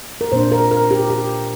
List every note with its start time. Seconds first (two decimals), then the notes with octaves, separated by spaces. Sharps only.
0.21 A#4
0.32 A#2 A#3 D4 C5
0.52 A#4
0.71 A#4
0.91 G4
1.10 G4